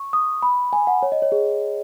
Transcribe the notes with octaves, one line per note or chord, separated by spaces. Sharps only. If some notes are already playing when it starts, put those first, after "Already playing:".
Already playing: C#6
D#6
B5
G#5
F#5
C#5
D#5
C#5
G#4